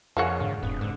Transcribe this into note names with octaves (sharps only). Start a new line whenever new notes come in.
F2 A#3 F4 F#4 G#4 C#5 F#5
G#2 D3
E1 G2 B3 C4 D4
G#2 D3